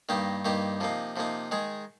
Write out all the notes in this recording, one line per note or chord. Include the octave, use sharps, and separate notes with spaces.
G2 D#3 A#3 D#4 G4
G2 D#3 A#3 D#4 G4
C3 F3 A#3 D#4
C3 F3 A#3 D#4
D#3 G#3 D#4 G#4